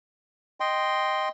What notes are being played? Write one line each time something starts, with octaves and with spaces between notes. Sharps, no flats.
D#5 G5 C6